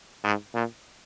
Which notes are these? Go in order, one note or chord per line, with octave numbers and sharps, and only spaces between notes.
G#2
A#2